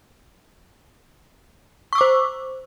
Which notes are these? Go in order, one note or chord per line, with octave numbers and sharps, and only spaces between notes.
C5 C#6 D6 E6